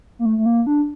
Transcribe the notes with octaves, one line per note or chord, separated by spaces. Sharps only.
A#3
A3
A3
A#3
D4